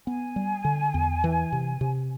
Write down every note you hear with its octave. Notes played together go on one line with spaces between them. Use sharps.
B3 G#5
G3
D3
E2
E3
C3
C3